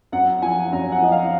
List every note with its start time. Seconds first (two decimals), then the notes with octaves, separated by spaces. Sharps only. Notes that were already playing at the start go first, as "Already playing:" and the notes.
0.12 F#2 F#5
0.42 F3 G#5
0.72 F#2 A#5
0.92 F#5
1.02 F3 D#5
1.12 F5